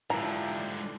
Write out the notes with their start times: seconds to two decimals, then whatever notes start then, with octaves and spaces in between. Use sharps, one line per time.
0.10 G#2 D3 F3 G3 E4 A#5